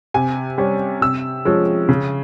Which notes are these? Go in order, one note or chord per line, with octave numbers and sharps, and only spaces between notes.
C3 G#5
G3 C#4
C3 E6
F3 G#3 C#4
C#3